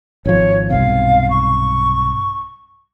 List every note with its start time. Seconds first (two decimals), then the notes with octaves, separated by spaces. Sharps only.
0.25 G#1 F3 C#5
0.70 B1 G2 C3 F5
1.30 C#6